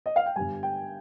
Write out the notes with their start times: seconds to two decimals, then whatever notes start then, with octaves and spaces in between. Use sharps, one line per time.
0.06 D#5
0.16 F5
0.26 G5
0.36 G1 G2 G3 G#5
0.63 G5